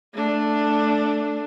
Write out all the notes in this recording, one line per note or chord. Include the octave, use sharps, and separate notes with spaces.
A3 D4